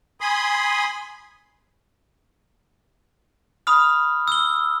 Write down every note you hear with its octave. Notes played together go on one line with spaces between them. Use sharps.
G#5 B5 C6 D#6
B5 D#6 F6
E6 G7